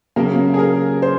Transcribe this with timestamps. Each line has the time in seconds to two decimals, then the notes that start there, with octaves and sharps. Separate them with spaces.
0.16 C#3 F#3 A#3 A#4
0.54 G#4
0.59 A#4
1.02 C5